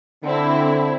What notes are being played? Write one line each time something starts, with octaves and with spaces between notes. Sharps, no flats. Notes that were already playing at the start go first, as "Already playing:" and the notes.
D3 C4 E4